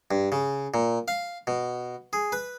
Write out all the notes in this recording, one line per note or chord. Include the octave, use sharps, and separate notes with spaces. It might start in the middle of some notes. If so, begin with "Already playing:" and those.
G2
C#3
A#2
F5
B2
G#4
B4